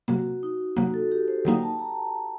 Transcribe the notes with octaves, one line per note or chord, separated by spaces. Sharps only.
C3 F#3 A#3 F#4
D#4
C3 F#3 A#3 F#4
A4
G4
C5
D3 F#3 A#3 D#4 G5
A5
A#5